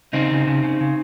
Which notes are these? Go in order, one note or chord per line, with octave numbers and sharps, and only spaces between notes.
C#3 C4 D#4
C#3
C#3
C#3
C#3